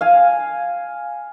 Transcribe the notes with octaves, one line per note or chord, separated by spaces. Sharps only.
F5 G#5